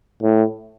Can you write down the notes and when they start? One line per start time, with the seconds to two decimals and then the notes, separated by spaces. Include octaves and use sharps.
0.23 A2